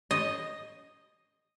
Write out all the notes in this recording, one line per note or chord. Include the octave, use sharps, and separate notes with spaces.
D#5